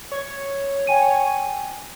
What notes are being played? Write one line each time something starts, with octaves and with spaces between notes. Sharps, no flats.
C#5
G5 G#5 D#7